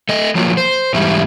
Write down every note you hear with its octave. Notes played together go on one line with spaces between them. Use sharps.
A3 D#5
F3 F#3 A#3
C5
E2 G#2 G3 E4